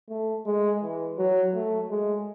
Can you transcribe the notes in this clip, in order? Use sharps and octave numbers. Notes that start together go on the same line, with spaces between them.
A3
G#3
E3
F#3
A3
G#3